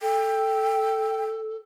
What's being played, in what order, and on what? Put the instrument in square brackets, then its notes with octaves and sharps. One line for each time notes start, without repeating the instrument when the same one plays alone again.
[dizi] A4 [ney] G5